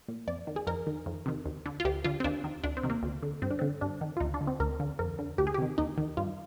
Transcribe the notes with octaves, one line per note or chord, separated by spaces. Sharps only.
A#2
F2 D5
D#3
G#4
F2 A#4
D#3
F2
C3 D#3
D#2
D3
F4
D2 G4
D3 F4
C4
D#2 D4
D#3
D2 D4
C4
C3 D#3
A#3
D2
D3
G2 C4
D4
D3 C4
G2 D4
D#3
F4
D2 D#4
D4
D3
C4
D2 A#4
D3
F2 A#4
D3
D2 G4
G#4
G4
C3 D#3
D#2 D#4
D#3
G2 F4